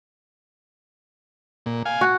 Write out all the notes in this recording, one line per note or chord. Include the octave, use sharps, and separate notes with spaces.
A#2
F5 G#5
F#4